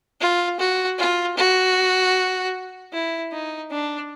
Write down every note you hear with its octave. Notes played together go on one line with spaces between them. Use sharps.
F4
F#4
F4
F#4
E4
D#4
D4